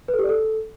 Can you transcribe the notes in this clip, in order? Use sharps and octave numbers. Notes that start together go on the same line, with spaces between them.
B4
A4
G4
D5
A4